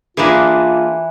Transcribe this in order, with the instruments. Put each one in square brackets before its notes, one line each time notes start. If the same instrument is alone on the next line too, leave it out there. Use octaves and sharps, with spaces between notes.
[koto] E3 B4 [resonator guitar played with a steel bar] A#3 D4 G#4 [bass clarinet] F4